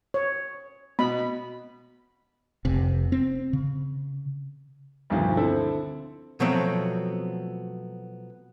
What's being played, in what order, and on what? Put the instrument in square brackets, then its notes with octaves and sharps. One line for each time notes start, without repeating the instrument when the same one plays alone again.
[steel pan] C#5
[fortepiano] B2 [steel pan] D#5 B5
[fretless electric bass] F1 C3
C4
C#3
[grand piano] D2 G2 B2 D#3 F3
D3 C4 E4 A4 C5
[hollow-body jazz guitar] B2 F3 F#3 A3 B3 C4